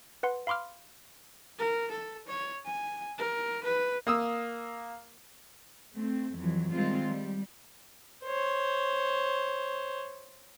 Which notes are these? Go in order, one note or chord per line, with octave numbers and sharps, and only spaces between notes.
B4 F#5 C6
F5 B5 C6 D6 F6
A#4
A4
C#5
G#5
A#4
B4
A#3 D#6 E6
A3 C4
F2 E3 F#3
D#3 G3 G#3 C4 F4
G3
C5 C#5